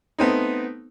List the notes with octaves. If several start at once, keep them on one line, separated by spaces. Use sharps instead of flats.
A3 B3 C4 D#4